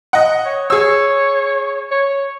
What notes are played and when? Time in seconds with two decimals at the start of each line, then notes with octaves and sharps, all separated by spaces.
0.13 D#5 F#5
0.45 C#5
0.70 G#4 C#5 E6
1.91 C#5